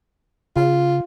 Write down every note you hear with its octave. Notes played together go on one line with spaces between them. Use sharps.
C#3 F4